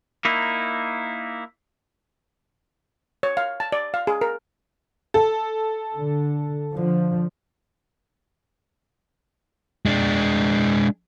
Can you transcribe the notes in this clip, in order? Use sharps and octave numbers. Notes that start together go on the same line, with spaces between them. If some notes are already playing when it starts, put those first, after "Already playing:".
A#3 D#4 E4
C#5
F5
A5
D5
F5
G#4
A#4
A4
D3
D3 F3
G#3 D4